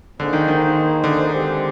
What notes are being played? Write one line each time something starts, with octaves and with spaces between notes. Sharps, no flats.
D3 A#3 D#4 G#4 C5
D#3
D#3
D3
G#3 C4 G4